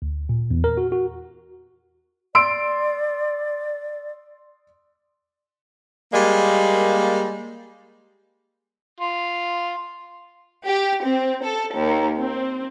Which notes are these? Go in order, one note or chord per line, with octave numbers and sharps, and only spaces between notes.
D2
A#2
E2
A#4
F#4
F#4
D5 C6 E6 D7
G3 G#3 A#3
F4
G4
C4
A4
D#2
C4